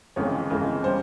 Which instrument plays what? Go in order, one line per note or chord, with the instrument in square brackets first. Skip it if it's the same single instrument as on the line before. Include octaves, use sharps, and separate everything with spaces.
[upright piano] G1 F2 C#3 E3 G#3 C#5
G1 F2 C#3 E3 G#3
G3 C#4 C5